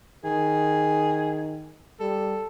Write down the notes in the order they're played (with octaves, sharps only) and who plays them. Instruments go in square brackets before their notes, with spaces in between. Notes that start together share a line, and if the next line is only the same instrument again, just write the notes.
[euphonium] D#3 [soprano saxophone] G#4
[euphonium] G3 [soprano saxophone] A4